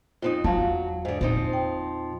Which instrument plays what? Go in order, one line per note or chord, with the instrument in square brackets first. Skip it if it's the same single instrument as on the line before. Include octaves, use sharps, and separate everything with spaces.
[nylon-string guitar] F2 C4 D#4 [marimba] F4
[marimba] E2 F5 A5 [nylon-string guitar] F#3 [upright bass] F4
[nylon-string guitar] G#2 D3
[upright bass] A#2 [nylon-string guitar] F3 C4 D#4
[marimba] G5